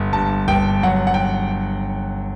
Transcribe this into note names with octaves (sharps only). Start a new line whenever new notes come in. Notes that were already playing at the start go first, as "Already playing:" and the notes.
Already playing: G1
G2 A5
G1 G5
F#3 F#5
F#5
G5